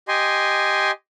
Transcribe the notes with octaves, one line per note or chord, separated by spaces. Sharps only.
G4 D#5 G#5 C6